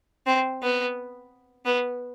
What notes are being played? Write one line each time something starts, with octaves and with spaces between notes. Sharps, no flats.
C4
B3
B3